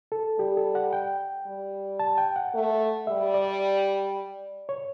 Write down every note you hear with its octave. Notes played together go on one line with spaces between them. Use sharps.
A4
G3 G4
A4
F#5
G5
G3
A5
G5
F#5
A3
G3 E5
D5
C#5